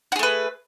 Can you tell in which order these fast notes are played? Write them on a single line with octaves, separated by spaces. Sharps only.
F#4 G#4 A3 B4